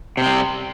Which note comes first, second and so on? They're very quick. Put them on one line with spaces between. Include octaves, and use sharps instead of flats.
C3 C4 G3